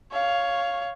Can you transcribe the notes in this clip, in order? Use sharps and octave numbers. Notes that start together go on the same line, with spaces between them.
C#5 F5